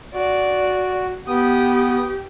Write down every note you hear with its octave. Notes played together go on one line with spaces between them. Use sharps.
F#4 D5
B3 G4 D#6